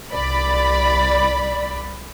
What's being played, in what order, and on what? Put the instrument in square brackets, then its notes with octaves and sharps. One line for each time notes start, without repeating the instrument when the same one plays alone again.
[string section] C2 D5 B5